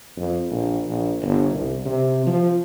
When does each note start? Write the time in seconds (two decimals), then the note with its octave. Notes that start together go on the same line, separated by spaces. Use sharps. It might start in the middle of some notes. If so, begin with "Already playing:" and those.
0.17 F2
0.51 A#1
0.86 A#1
1.22 G1
1.53 C2
1.85 C3
2.27 F3